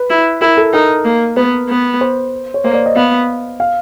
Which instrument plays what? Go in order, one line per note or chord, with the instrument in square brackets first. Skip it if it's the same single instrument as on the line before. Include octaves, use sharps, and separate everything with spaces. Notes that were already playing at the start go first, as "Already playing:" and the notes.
Already playing: [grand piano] B4
[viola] E4
[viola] E4 [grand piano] A#4
[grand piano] A4
[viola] D#4 [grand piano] A#4
[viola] A#3
[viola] B3 [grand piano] B4
[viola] B3
[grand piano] C5
C#5
[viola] A#3 [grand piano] C5
[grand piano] D5
D#5
[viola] B3 [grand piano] F5
[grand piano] F5